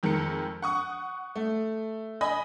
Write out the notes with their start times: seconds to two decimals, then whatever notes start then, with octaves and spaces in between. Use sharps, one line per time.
0.03 F2 D#3 G#3 A#4 C#7
0.62 F#5 C#6 D#6
1.36 A3
2.21 D#5 G#5 B5 D#6